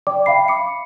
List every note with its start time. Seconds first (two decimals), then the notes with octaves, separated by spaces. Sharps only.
0.07 D5 G5 D6
0.26 E5 F5 G5 B5 C7
0.48 B5 D6 C#7